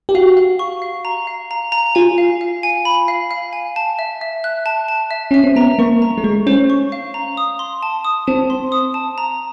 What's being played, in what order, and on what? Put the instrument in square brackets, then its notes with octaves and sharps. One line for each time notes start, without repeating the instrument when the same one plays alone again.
[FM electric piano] G4
[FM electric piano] F#4 [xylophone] F5
[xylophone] F5
C#6
F5
A#5
F5
A#5
A#5
[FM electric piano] F4 [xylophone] G#5
[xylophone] F5
F5
G#5
B5
F5
F5
G#5
A5
E5
E5
F#6
A5
A5
E5
[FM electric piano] C#4 [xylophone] E5
[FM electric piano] C4
[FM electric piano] B3 [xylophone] A#5
[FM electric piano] A#3 [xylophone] C#6
[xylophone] A#5
[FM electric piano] A3
[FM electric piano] G#3 [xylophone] C#6
[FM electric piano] C#4 [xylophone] C5
[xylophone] C#6
F5
A#5
D#6
C6
A5
D#6
[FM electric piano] C4 [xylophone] A5
[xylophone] C6
D#6
A5
A#5